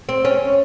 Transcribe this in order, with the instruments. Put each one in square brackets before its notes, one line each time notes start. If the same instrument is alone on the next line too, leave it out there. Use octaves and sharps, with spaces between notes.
[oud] C4
C#4